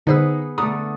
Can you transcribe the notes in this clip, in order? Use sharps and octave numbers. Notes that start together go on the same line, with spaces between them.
D3 B3 D#4 G#4 B4 C5 E6
D3 A3 A#5 D#6